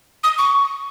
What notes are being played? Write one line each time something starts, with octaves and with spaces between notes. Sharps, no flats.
D#6
C#6